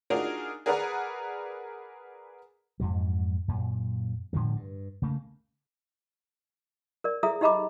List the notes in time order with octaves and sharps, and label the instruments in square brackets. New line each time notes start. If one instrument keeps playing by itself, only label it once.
[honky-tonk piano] D4 D#4 F4 F#4 G#4 A#4
G#4 A#4 B4 D5 F#5 A#5
[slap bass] F2 G#2 F#3
F#2 A#2
A2 D3 F3 G#3
G2
C#3 A3 A#3
[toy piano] A#4 D5
G#4 A4 E5 A#5 D#6
D#4 G4 D#5 A#5 B5 D6